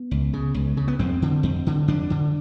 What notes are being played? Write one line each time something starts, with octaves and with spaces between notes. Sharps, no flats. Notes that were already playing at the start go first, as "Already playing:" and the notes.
Already playing: B3
C#2
C#3
C#2
C#3
B3
F2 C4
D3
F2
D3
F2 D4
D3